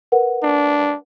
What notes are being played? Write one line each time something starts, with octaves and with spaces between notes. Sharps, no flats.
A#4 B4 F#5
D4